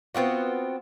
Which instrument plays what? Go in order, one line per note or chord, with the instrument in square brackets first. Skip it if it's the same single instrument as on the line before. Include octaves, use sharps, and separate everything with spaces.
[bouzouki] B3 C4 F4 F#4